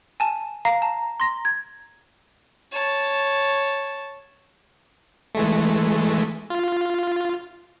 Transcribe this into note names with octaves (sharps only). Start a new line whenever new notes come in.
G#5 A5
F5 A#5
A5
C6 A#6
G#6
C#5 A5
E3 G#3 A3
F4